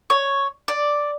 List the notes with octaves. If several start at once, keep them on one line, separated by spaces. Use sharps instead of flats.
C#5
D5